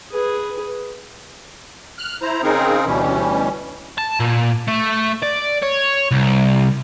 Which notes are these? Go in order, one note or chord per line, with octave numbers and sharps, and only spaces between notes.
G#4 B4
F6 F#6
E4 C5 A#5
C#3 C4 D#4 G#4 A#4
D2 B2 E3 G3 C#4
A5
A#2
A3
D5
C#5
C2